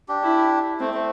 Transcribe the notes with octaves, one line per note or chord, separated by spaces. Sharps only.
D4 G4
E4
A3 C4
A3